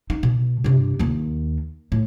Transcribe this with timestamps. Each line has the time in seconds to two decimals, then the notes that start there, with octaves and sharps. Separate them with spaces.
0.10 D#4
0.23 B2
0.64 G2 C3
0.99 D#2 D#3
1.92 A2